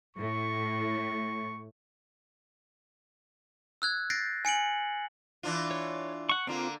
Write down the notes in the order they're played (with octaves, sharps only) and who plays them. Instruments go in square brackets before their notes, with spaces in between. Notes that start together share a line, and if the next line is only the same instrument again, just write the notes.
[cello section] A2 [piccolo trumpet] C#6
[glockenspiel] E6 F#6 G#6
G6 A6 A#6 C7 D7
G#5 C#7 D7 F#7
[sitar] E3 D4 F4
[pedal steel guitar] C#5
F#5 C#6
[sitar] D3 A#3 [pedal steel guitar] C4 F4